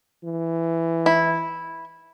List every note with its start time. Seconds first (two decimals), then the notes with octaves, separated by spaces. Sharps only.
0.25 E3
1.06 E4